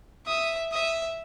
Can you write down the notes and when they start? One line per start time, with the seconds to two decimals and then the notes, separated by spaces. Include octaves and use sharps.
0.26 E5 D#6
0.72 E5 D#6